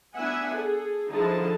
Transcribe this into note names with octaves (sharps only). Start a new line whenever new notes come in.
B3 D4 E4 E5 F#5 G#5
G#4 A4
D3 F3 D#4 E4 G#4 A5